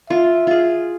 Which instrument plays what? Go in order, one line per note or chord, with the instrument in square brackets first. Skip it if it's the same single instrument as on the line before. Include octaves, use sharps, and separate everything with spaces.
[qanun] F4 [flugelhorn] E5
[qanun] F4 G#4